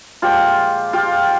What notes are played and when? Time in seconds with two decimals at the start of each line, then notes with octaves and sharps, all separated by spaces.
0.22 A#2 F3 G#3 F4 G4
0.93 F4 G4